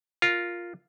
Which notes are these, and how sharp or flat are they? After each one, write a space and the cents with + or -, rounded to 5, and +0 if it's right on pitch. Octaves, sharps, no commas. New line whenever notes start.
F4 +0 A#4 +0